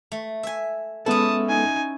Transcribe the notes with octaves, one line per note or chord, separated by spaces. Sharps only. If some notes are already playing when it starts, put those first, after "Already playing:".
A3
E5 G#5
G#3 B3 C#4 E4 A4 A5 D#6
D#4 G#5